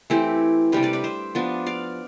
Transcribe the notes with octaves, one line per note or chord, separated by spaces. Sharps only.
E3 A3 C4 E4 G4
C3 G3 D4 G4 B4
B4 D5
B4 D5
C5 E5
F3 B3 D4
D5 F5